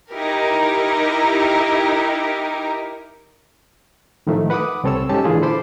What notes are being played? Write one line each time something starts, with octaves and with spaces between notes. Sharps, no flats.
D#4 E4 G4 A#4
A2 D#3 F3 A3
B4 F#5 B5 D6 D#6
C2 C4 A4 C#5 E6
G#2 C#4 G4 A4 A5 E6
A#2 D3 E3 F4 G#4
A4 C5 B5 C6 D6